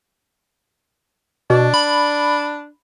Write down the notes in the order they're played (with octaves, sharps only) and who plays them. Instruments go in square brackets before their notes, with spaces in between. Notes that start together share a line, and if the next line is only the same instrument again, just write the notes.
[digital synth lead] B2 [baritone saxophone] D4
[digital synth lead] B5